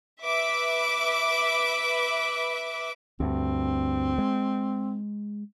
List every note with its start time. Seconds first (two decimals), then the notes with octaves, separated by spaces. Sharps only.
0.24 B4 E5 D6
3.20 D2 G2 C4
4.18 G#3